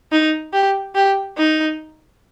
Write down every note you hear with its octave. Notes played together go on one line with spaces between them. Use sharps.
D#4
G4
G4
D#4